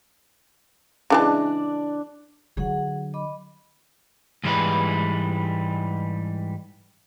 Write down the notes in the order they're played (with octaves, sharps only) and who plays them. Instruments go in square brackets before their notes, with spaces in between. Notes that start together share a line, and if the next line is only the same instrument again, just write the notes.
[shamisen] C#3 E3 G#3 [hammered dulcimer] D4 D5
[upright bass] D3 F#3 [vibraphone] G#4 F#5
[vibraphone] D#5 B5 D6
[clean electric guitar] G#2 E3 F3 G3 G#3 B4